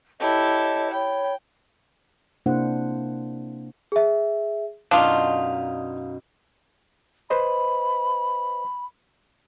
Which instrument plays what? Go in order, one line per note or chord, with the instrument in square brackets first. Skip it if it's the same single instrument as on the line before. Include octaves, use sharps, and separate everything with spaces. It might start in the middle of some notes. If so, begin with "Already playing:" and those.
[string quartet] E4 G4 A4 [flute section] C#5 D#5
[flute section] C#5 B5 [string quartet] G5
[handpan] C3 A#3 D4 E4 C5 F#5
[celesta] G#4 E5
[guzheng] F#2 B2 D#4 [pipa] D4 F4 [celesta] F5 D#6
[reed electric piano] B4 C5 D#5 [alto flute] B5